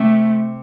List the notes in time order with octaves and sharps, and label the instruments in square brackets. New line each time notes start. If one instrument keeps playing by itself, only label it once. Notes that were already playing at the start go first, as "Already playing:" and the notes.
Already playing: [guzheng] C3 [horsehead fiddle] A3